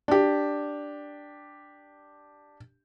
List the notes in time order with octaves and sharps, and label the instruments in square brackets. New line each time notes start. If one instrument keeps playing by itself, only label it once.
[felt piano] D4 G4